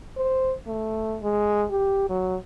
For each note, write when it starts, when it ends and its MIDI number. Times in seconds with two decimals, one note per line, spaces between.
0.17 0.54 72
0.67 1.17 57
1.23 1.65 56
1.70 2.08 67
2.09 2.36 54